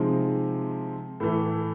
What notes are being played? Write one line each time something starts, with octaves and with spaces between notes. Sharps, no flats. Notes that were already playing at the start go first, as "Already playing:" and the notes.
Already playing: C3 F3 G#3 C4 D#4
A2 E3 A3